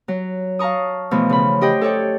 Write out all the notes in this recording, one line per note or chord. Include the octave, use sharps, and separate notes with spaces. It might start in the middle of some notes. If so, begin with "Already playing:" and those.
F#3
F5 A5 A#5 C#6 D#6
B2 E3 F3 A3
C#3 B5
G4 C5 D#5 F#5 G5
A4 C#5 D5 G5